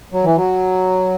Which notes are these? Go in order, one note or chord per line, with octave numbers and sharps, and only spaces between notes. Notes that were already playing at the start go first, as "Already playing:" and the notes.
F#3
E3
F#3